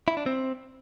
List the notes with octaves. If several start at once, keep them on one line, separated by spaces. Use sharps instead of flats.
E4
D4
C4